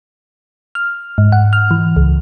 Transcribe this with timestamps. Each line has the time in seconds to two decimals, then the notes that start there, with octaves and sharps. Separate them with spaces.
0.75 F6
1.18 G#2
1.32 F#5
1.53 F6
1.71 E3
1.96 C#2